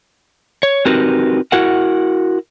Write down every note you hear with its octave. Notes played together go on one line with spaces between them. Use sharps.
C#5
C4 D#4 F#4 G4 A#4 B4
E4 F#4 A#4 F#5